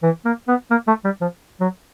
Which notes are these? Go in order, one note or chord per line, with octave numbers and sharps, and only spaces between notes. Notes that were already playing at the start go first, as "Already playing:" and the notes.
E3
A#3
B3
A#3
A3
G3
F3
F#3